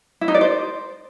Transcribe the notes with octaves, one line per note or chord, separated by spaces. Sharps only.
E4
D#4
D5
C5